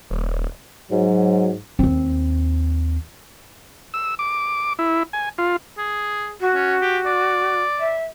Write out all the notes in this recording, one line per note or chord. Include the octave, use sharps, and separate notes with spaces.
D#1
G#2 F#3
D#2 C4
E6
D6
E4
G#5
F4
G#4
F#4
C#4
G4
D5
E5